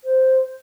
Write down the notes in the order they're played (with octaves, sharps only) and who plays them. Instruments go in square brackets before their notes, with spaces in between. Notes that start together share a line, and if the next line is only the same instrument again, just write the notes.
[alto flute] C5